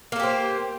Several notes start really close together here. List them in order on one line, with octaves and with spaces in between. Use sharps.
A#3 A4 G4 C5